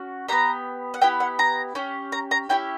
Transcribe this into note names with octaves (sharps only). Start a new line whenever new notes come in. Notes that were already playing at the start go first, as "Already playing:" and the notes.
Already playing: C#4 F#4
B3 D4 G4 A#5
F#5
B3 E4 G4 G5
F#5
A#5
C#4 G4
A#5
A#5
C#4 E4 G4 G5